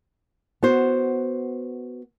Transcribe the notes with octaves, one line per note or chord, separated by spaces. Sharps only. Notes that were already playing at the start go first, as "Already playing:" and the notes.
B3 F#4 C5